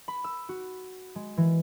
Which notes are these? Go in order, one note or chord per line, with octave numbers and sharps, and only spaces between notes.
B5
E6
F#4
G#3
E3